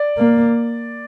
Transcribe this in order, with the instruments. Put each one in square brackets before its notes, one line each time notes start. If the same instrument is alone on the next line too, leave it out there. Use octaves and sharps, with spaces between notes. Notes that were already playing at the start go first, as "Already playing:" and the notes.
Already playing: [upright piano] D5
[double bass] A#3